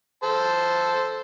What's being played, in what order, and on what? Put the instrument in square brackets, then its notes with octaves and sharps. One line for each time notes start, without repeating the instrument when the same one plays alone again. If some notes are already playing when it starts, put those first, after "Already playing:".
[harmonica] A4 C5 A5